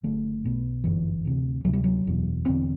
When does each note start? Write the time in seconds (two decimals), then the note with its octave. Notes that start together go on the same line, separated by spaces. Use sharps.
0.03 F#1 F#2 D3 A3
0.44 B1 B2
0.84 G1 F#2 D3 E3
1.25 D2 C3
1.64 D2 C3 F#3
1.73 G3
1.84 F#3
2.04 F#1 E2 B2
2.46 E1 E2 D3 C4